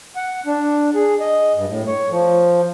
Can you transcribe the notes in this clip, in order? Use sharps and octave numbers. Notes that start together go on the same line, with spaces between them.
F#5
D4
G#4
D#5
G2
A2
C#5
F3